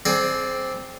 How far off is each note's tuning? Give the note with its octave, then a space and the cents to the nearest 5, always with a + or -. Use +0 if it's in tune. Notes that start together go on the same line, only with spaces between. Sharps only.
C4 +0 G#4 +35 D5 +0